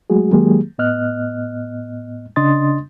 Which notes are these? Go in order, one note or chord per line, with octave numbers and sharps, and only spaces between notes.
F#3 G#3 A3 F#4 G#4
D#3 F#3 G#3 A#3 G4 G#4
A2 B3 D#5 F6 F#6
C#3 D4 D#5 C6 D#6 A6